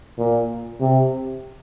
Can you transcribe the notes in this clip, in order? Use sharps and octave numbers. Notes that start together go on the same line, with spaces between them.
A#2
C3